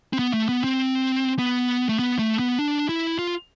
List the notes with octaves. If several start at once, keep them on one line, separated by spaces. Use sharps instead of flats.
C4
B3
A3
B3
C4
B3
A3
B3
A3
B3
D4
E4
F4